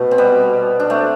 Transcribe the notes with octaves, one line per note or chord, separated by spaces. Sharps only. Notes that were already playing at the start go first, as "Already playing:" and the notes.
Already playing: B2 A3
C4
G3 B3
D4
A3 C4